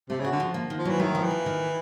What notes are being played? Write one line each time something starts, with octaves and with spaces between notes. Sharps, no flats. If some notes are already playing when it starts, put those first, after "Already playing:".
C3 A3
C#3 F#4
D3
F3
A#3
D#3
F3
E3 F#3
D#3 A3
F3
E3
F3
D#3